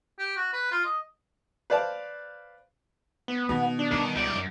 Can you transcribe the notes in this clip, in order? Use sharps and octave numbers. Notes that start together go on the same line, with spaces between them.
G4
F#4
B4
F4
D#5
B4 C5 D5 F5 A5
B3
B2 D#3
D4
D#3 G3
C#2 D#4 D5
F#2